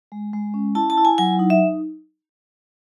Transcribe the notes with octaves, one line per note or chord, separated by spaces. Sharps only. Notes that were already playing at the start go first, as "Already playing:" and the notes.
G#3
G#3
C#4
E4 A5
A5
E4
G#5
F#3 G#5
D#4
E5